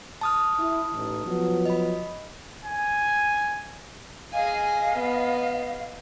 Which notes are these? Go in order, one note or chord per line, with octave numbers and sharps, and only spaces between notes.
A5 D#6 F6
E4
A1 D#4
F3 F#3 B3
D#5 B5
G#5
G#4 D#5 F5 G#5
B3